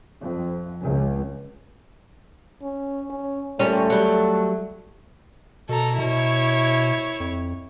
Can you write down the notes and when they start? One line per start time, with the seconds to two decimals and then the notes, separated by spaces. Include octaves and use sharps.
0.21 F2
0.84 C#2
2.62 C#4
3.10 C#4
3.59 A#2 G3 A3 C#4
3.90 F#3 G3
5.69 B2 A4 A#5
5.99 B2 E4 C#5
7.20 F2